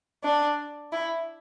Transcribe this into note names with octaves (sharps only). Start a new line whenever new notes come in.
D4
E4